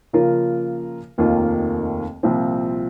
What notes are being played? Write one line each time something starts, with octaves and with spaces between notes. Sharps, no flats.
C#3 F3 A#3 F4 A#4
F1 D#2 D#3 A#3 F4
C2 A#2 F3 C4 F4